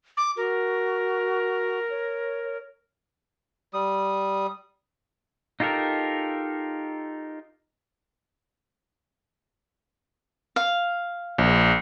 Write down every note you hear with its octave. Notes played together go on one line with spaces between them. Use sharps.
D6
F#4 A#4
C#5
G3 D#6
D#4 F4 G4 A4 A#4
F5
A#1